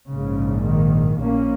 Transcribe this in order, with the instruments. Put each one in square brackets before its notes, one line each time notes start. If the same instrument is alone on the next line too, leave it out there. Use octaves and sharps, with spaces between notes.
[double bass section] A#1 G#2 C#3
D#3
A#1 A#2 A#3 C#4